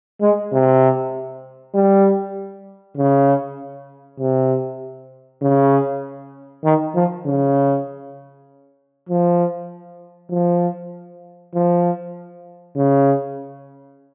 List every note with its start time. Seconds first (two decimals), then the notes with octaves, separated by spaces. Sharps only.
0.21 G#3
0.53 C3
1.75 G3
2.98 C#3
4.20 C3
5.42 C#3
6.64 D#3
6.95 F3
7.26 C#3
9.09 F3
10.32 F3
11.54 F3
12.77 C#3